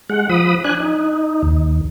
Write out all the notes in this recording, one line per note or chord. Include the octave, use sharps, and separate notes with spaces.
G#3 F#5
F3 B5 D#6
D4 G#5 F#6
D#4
D#2